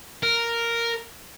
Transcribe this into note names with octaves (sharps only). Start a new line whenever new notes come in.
A#4